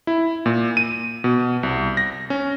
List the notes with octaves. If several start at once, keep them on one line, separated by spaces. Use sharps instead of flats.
E4
A#2
D#7
B2
C2
A#6
C#4